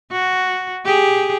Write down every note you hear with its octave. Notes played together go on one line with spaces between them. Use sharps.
F#4
G4 G#4